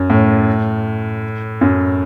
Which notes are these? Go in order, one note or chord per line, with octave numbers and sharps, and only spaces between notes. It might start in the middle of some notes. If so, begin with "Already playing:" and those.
Already playing: F#2
A2
F#2